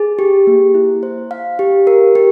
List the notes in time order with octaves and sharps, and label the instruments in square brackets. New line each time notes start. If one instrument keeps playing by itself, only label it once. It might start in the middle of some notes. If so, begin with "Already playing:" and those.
Already playing: [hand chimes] G#4
G4
A#3
E4
C5
F5
G4
A#4
G4